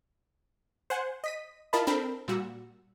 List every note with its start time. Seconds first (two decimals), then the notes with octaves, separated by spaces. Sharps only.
0.90 C5 F#5 G#5
1.24 D#5 B6 D#7
1.73 E4 F4 A#4 D#5 A5 B5
1.87 C4 D4 A4 A#4 B5
2.28 A#2 G3 F#4 E6